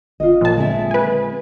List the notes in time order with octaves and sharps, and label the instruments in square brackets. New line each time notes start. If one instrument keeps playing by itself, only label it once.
[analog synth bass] G#1 [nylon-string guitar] F4 D#5
[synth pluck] A#2 A5 [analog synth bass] F3
[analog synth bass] D3 [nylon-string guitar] G#3 C4 E5
[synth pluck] B4 G#5